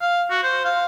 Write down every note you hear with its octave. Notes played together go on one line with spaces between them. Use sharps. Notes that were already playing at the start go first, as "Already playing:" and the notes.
F5
F#4
C5
F5